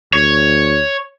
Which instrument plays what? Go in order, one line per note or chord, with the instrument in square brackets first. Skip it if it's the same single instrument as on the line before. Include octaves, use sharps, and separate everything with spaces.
[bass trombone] D2 [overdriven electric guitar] C#5